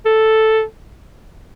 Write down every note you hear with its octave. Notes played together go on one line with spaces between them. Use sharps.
A4